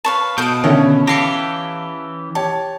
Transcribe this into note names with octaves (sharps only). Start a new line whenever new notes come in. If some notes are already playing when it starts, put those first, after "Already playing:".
B4 C#5 F5 A5
B2 A4 D#5 F5 G6 D7
D3 D#3 C#4 C#5 E5
E3 G4 A4 F5 B5 A#6 C7 C#7
G4 C#5 A5